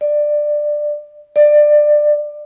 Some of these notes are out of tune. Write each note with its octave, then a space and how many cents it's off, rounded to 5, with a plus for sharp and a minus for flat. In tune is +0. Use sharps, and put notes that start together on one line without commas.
D5 +15
D5 +20